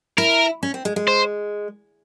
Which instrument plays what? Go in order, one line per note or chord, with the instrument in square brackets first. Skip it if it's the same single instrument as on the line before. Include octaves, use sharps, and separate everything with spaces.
[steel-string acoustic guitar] E4 [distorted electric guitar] A#4
[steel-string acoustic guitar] C#4
C4
G#3
G#3
[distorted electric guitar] C5